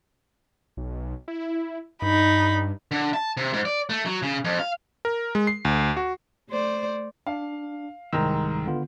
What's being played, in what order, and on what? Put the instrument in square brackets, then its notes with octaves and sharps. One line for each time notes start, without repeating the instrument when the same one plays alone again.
[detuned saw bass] B1
E4
[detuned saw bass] G2 [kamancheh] D#4 B5
[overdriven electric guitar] D3
A5
C3
G#2
D5
A3
F#3
C#3
F2
F5
[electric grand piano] A#4
G#3
C7
D2
F#4
[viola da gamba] A3 C5 D5
[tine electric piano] D4 [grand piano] F5
[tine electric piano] C2 A#5 E6 [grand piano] G#2 D#3
[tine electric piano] D3 B3 F4